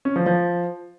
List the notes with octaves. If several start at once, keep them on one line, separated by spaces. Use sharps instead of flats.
C#4
F3
F3